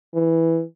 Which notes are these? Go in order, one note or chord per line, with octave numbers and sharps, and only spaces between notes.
E3